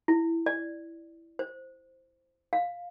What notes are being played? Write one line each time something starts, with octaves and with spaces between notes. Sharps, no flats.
E4
D5
C5
F5